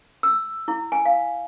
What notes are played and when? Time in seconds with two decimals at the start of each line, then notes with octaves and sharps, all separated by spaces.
0.23 E6
0.68 E4
0.92 G#5
1.05 F5